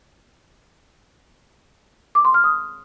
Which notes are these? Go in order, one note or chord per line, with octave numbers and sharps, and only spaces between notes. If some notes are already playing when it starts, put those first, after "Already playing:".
D6
C6
F6
D#6